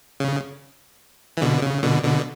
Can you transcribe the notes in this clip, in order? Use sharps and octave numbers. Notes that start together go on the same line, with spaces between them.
C#3
E3
B2 D3
C#3
B2 D3
B2 D3